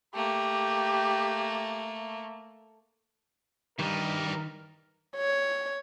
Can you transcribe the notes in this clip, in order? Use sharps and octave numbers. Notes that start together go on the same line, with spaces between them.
A3 A#3 G4
G2 D#3 E3 G3 A#4 D#5
C#5